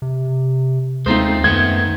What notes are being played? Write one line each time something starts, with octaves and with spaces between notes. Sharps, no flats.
C3
D#2 G#3 A3 C4 D#4 F4 C5
F#2 D#3 A3 B3 G#6